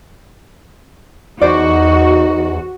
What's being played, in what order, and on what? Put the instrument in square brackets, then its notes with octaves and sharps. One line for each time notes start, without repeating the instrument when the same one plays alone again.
[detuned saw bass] E2 [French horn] D#4 [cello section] F#4 [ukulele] C5 D5